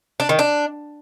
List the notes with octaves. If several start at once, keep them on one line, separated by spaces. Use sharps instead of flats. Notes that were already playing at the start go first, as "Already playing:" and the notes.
D4
D#3
D4